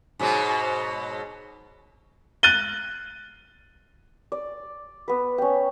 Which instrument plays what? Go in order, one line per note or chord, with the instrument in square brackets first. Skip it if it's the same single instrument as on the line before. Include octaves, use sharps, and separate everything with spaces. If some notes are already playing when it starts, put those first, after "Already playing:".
[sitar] G#2 B2 F#3
[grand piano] F#6 A6 D#7 G7
[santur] D5
B3 B4
C#4 G5